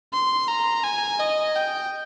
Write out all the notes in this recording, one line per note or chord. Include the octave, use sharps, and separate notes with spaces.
C6
A#5
G#5
D#5
G5